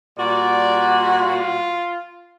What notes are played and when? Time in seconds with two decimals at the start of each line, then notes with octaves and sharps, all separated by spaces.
0.18 A#2 G3 F#4 D5
1.20 F4